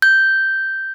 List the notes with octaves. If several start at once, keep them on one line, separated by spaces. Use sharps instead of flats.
G6